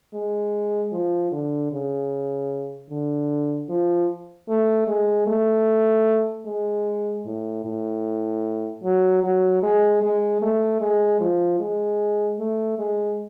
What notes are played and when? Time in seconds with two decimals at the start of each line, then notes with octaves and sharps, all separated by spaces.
0.14 G#3
0.93 F3
1.32 D3
1.72 C#3
2.90 D3
3.69 F3
4.49 A3
4.88 G#3
5.27 A3
6.46 G#3
7.25 A2
7.65 A2
8.84 F#3
9.23 F#3
9.63 G#3
10.02 G#3
10.42 A3
10.81 G#3
11.20 F3
11.60 G#3
12.39 A3
12.79 G#3